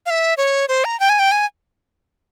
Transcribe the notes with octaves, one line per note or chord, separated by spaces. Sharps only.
F5
E5
C#5
C5
A#5
G5
G#5
G5
G#5